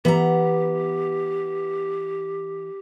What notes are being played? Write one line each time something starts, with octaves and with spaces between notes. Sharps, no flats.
E3 B3 G4 A5 A#5